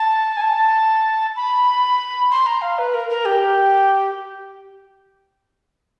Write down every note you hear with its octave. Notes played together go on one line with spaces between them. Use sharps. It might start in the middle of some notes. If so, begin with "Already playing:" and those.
Already playing: A5
G#5
A5
B5
C6
A#5
F5
B4
A#4
A#4
G4